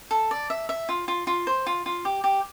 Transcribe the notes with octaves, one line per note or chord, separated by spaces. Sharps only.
A4
D5
E5
E5
F4
F4
F4
C5
F4
F4
G4
G4